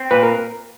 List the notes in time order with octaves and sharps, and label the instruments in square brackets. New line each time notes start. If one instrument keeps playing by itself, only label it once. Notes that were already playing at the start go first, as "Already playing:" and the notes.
Already playing: [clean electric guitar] C4
[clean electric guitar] A#2 [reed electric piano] B4
[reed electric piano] A#4